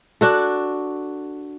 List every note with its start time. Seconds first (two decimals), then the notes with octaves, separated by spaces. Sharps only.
0.21 D4 F#4 A4